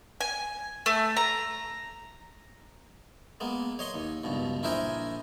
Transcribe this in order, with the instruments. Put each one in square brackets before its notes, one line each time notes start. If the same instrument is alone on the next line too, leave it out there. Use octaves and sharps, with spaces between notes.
[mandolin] G#5
A3
A#5
[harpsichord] G#3 A#3 B3
C#5 D#5 C6 C#6
D#2
C#2 G2 B2
A#1 E4 A#4 C5 D#5 G#5